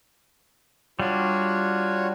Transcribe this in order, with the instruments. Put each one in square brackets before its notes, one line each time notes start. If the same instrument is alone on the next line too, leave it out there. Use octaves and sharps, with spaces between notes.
[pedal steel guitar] G3 D4 [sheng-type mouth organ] F4 F#4 C#5